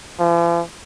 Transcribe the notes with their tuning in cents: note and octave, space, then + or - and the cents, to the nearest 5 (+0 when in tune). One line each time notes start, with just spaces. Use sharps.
F3 -45